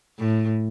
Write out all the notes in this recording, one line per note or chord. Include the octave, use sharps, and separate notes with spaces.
A2